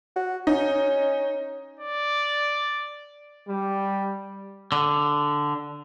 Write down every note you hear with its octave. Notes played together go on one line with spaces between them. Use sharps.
F#4
C#4 D#4
D5
G3
D3